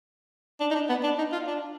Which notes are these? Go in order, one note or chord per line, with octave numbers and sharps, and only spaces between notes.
D4
D#4
D4
B3
D4
D#4
F4
D4